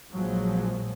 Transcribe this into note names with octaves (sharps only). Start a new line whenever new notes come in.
A#1 F3 F#3 G#3